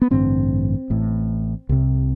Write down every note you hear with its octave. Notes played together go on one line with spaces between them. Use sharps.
B3
A1 G2 D3 C4
A1 A2
C2 C3